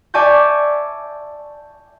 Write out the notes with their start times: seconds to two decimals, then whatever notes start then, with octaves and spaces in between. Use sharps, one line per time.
0.14 D5 E5 G#5 A5 C#6 G6